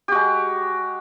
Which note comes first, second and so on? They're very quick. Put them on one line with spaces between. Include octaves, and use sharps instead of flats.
G4 F#4 G#3